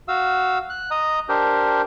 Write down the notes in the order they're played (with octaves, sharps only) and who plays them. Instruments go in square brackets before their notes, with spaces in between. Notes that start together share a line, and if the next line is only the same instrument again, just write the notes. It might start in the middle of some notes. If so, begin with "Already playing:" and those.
[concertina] F#4 F5 E6
F#6
D#5 A#5 D#6
D4 G4 A#4 C5